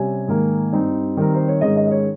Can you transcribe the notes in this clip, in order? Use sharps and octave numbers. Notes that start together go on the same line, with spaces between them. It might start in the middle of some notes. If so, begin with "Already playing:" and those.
Already playing: C3 G3 C#4 G#5
G#2 D#3 A#3
G2 G3 C4 D#4
D#3 G3 C4 A#4
C5
C#5
G#2 D#3 G#3 C#4 D#5
D#5
D#5
C#5